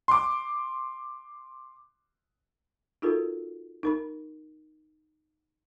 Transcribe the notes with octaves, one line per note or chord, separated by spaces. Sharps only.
C6 D6
D#4 F4 F#4 A4 A#4
D#4 A#4 B5